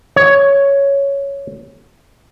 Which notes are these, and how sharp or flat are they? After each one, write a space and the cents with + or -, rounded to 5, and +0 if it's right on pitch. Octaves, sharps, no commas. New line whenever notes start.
C#5 +5